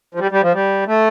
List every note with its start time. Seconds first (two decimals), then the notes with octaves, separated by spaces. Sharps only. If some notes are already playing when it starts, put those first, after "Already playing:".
0.14 F3
0.20 G3
0.31 G3
0.42 F3
0.54 G3
0.87 A3